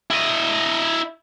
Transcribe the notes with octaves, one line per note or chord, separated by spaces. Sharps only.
E4 D#5